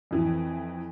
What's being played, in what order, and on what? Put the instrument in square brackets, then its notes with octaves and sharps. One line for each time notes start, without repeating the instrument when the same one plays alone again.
[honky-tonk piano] F2 E3